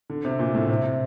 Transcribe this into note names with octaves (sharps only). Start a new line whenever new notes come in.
D3
C3
A#2
A2
C3